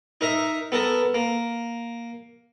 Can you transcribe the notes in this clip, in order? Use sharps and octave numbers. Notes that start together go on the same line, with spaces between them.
D#4 A#4 E5 A#5
B3 A4 A#4 A5
A#3